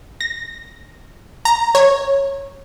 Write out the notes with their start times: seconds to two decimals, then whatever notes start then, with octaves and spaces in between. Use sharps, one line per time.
0.21 A#6
1.45 A#5
1.75 C#5